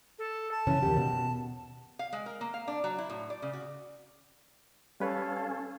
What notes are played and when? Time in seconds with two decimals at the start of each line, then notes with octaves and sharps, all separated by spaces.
0.19 A4
0.51 A5
0.67 C#3 E3 C#4
0.83 D#2 G4
0.97 B2
1.99 F5
2.13 G#3
2.26 A#4
2.41 A#3
2.54 F5
2.68 D4
2.84 F#3
2.98 E4
3.10 A2
3.30 D5
3.42 C#3
3.53 F#4
5.00 G3 C#4 A4 B4 C#5 F5